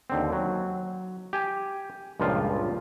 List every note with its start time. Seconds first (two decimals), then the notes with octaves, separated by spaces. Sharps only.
0.10 D#2 D3 C4
0.32 F#3
1.33 G4 G#5
2.20 C#2 G2 A#2 F3 F4